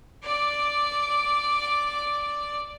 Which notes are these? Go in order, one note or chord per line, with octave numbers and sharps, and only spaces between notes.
D5 D6